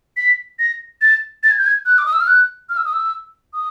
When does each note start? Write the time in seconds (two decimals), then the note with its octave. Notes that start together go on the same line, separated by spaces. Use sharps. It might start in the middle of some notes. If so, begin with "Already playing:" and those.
0.17 B6
0.59 A#6
1.02 A6
1.43 A6
1.51 G#6
1.58 G6
1.66 G#6
1.86 F#6
1.98 D6
2.06 D#6
2.13 E6
2.20 F6
2.27 F#6
2.69 F6
2.77 E6
2.85 D#6
2.93 E6
3.53 D#6